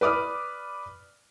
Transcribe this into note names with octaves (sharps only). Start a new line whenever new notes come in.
B4 D5 D6 D#6 F6